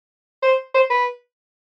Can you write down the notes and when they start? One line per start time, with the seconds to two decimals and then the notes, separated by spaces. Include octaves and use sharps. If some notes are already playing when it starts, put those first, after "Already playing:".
0.42 C5
0.75 C5
0.90 B4